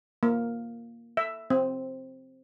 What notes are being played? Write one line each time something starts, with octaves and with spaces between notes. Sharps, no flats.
A#3
E5
C4